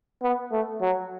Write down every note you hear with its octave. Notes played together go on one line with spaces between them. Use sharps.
B3
A3
F#3